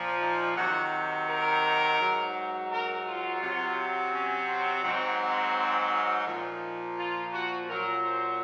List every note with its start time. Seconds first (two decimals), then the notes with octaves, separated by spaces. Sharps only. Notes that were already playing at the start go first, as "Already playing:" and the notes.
Already playing: A#2 F3
0.21 D#4
0.56 C3 D#3 F#3 F#4
1.28 A#4
1.99 G#2 F#3
2.70 A#4
3.06 F4
3.41 C3 F#3
4.12 C#4
4.48 C4
4.84 G#2 F#3 C4
5.19 C4
6.26 A#2 F3 D#4
6.97 F4
7.32 F#4
7.68 A#2 F#3 A#4
8.04 C5